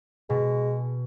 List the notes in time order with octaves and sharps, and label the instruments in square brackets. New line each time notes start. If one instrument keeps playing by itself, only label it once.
[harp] B2 [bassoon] G#3